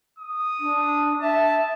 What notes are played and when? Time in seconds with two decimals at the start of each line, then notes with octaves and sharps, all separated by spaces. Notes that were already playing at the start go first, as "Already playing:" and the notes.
0.18 D#6
0.60 D4
1.21 E5 A5